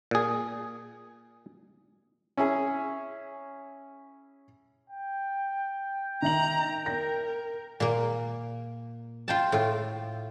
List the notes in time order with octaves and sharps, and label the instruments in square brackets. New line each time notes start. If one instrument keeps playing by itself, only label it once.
[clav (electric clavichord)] A#2 G#4
[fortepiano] C#4 E4 G#4
[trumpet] G5
[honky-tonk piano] D#3 E5 F#7 [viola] A#5
[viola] A#4 [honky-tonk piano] A#6
[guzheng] A#2 A#3
F4 G5 A5
A2 F4